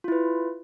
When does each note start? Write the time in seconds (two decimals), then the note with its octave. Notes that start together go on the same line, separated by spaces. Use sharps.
0.04 F4
0.08 E4
0.12 B4